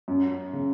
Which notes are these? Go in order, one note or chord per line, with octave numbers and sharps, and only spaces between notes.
F#2
C#3